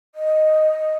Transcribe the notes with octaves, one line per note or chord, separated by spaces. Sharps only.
D#5